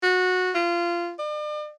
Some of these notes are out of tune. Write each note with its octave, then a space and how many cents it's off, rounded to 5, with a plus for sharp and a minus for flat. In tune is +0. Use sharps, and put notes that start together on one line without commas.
F#4 -15
F4 -20
D5 +40